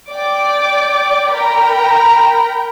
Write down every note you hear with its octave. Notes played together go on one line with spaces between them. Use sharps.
D5 G5 D6
A#4 G5 A#5 B5